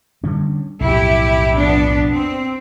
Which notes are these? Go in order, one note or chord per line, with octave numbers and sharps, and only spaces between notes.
D3 G3 C#4
B1 F2 A2 E4 G4
F3 B3 D4
C4